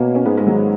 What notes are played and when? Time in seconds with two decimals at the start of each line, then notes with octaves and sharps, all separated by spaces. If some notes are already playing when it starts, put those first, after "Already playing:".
Already playing: B2 A#3 C#4
0.15 C#4
0.25 G#2 G#3 B3
0.38 G#3
0.47 D#3 F#3